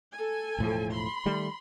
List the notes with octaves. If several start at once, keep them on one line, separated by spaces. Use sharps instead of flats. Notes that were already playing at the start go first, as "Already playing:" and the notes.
A4 G#5
E1 A2 F3
B5 C6
D#3 G3 A3